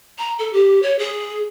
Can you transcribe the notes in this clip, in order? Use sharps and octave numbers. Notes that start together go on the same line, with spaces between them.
A#5
A4
G4
C#5
G#4